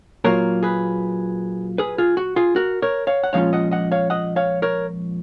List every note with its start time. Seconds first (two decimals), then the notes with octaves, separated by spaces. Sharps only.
0.24 A#2 F#3 A#3 F4 A#4 C#5
0.63 G#4 B4
1.78 G#4 B4
1.98 F4 G#4
2.17 F#4
2.36 F4 G#4
2.56 F#4 A#4
2.82 A#4 C#5
3.07 C#5 F5
3.24 F#5
3.33 A#2 F3 G#3 C#4 F4 C#5 F5
3.53 D#5 F#5
3.71 D#5 F#5
3.92 C#5 F5
4.10 D#5 F#5
4.36 C#5 F5
4.62 A#4 C#5